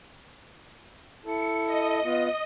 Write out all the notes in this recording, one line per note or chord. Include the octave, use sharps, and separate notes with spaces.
E4 A4 C#7
D#5
B3 F4